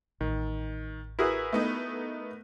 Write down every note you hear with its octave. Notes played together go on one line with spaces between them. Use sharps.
A1 D#3
E4 F#4 G#4 A#4 B4
A3 B3 D#4